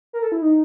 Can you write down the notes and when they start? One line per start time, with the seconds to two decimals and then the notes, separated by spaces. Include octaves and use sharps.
0.13 A#4
0.22 A4
0.32 E4
0.41 D#4